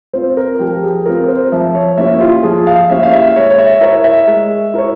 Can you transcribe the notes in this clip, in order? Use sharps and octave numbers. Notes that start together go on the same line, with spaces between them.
C4 F4 C5
A#4
F3 G4
G#4
C4 F4 A#4
C5
F3 E5
C#5
A#3 C#4 E4 G4 E5
F4
F3 G#4
F5
A#3 C#4 E4 G4 E5
F5
E5
G#3 C#5
C#5
E5
E4 A#4 C#5 E5
E5
G#3
E4 A#4 C#5